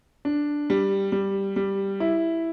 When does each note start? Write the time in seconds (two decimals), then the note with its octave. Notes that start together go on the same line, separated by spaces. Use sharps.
0.25 D4
0.70 G3
1.12 G3
1.56 G3
2.00 E4